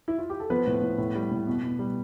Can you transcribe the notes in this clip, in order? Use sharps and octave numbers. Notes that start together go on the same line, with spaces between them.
E4
F4
G4
A4
F3 B3 B4
A2
A2
A2
G3
A2
B2
B2
G3